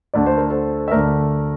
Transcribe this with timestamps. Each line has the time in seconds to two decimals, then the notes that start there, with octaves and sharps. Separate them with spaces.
0.14 D2 D3 A3 D5
0.26 C5
0.37 A#4
0.50 A4 C5
0.88 E5
0.91 D2 D3 A3 A#4 D5